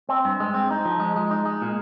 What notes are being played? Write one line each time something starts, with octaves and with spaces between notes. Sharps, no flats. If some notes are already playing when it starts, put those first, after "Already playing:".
C4
G2
G#3
C4
D#4
F3
G#3
G#3
D#4
G#3
A#2